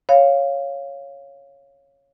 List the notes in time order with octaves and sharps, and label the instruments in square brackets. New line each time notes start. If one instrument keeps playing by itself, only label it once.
[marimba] C#5 F5